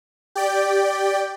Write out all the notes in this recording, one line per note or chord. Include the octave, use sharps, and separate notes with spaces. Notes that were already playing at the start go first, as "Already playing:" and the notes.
G4 D5 G5